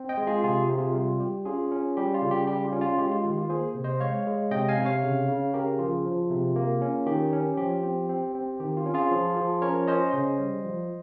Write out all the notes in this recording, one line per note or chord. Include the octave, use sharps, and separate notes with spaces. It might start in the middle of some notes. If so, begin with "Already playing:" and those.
Already playing: C4
D#5 G5
G#3
F4 G#4
C3 F4 G#4
G4
C3
F4 G#4
G3 F4
G3 G4
C#4 F4 G#4
C#4
G3 G4
F4
C#3
G4
G3 G4
F4
C#4
F4
G#3 G4
F4
D#3 G4
F4
A#3 G#4 C5
C3
C5 D#5
G#3 C#5 F5
G#3
C3 D#5 G5
F5 G#5
C3
C#5 F5
C#3
C#3
C#3 G4 A#4
F3 F4 G#4
F3
C3
A#3
C#4
D#3 G4
C#4
F3 G4
C4
C4
C4
D#3 G4
F4
C#4
F4 G#4
F3
F3
C#4 A#4 C#5
C#4 C5 D#5
C#3 C5 D#5
G3
F3